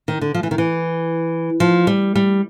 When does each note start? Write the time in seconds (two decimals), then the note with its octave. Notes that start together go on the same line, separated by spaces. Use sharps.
0.08 D#3
0.21 D3
0.34 F3
0.43 E3
0.51 D#3
0.58 E3
1.60 F3
1.87 G3
2.16 G3